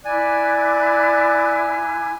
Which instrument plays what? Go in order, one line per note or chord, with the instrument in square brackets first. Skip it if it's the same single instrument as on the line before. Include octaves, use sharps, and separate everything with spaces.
[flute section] E4 D6 F#6 [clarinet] D5 [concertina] G#5